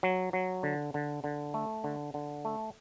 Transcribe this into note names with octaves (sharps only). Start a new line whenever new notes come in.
F#3
F#3
D3
D3
D3
A3
D3
D3
A3